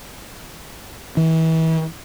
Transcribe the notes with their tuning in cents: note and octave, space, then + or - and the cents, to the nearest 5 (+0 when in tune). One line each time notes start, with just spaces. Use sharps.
E3 -35